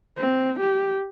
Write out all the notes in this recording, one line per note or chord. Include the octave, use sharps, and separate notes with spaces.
C4
G4